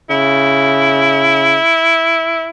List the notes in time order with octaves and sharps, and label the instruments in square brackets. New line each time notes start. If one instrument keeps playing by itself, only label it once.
[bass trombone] C#3 [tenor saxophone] E4